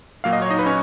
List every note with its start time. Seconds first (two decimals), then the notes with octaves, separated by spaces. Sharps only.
0.24 A#2 F#3 A#3 F5
0.33 D#5
0.42 C#5
0.50 D#4 D#5
0.59 B4
0.66 C#4 C#5